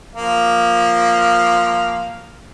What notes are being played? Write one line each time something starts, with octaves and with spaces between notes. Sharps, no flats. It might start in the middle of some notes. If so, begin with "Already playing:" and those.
F3 A#3 F5